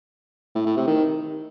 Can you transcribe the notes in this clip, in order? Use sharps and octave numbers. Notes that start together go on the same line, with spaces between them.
A2
A2
C3
D#3